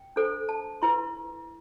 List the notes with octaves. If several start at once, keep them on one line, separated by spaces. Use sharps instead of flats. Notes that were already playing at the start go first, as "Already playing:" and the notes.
Already playing: G5
D4 A4 C5
A5
E4 B4 C6